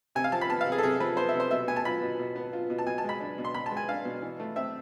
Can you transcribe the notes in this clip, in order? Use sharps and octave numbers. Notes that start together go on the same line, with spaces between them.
C3 G#5
F5
F3 A5
B5
B3 A5
F5
C3
G#4
A4
C3 G#4
F3 B4
B3 C5
E5
C3
C5
B2 E5
B3 G#5
A5
F4 B5
B2
B2
B3
F4
B2
A5
B2 G#5
A5
G#3 B5
D4
B2
C6
B2 B5
A5
G#3
G#5
D4 F5
B2
E3
A3
C4 E5